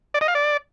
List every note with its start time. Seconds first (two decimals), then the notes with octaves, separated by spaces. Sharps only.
0.14 D5
0.21 D#5
0.28 F5
0.35 D5